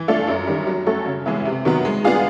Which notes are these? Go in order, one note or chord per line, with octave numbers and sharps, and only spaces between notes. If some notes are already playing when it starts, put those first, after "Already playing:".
Already playing: E3
A3 D4 F4 A4
F#2
D#3 G3
F#3
A3 C#4 F#4 A4
C#3
E3 G#3 B3 E4
C3
D#3 F#3 B3
G#3
B3 D4 F4 G#4